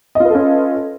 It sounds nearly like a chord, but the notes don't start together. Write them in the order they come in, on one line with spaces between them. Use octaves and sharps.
D#5 F4 B4 A4 C#4